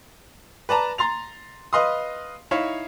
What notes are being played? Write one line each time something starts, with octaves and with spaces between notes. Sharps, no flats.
B4 D5 A5 A#5
A#5 C6 A6 F7
B4 D#5 F5 C6 D#6
D#4 E4 C#5 F5